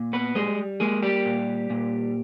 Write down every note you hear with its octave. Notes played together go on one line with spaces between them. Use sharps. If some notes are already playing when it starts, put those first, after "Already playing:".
Already playing: A#2
B3 B4
G3 G#3 G#4
G#3 A#3 G#4
G3 G4
A#2
A#2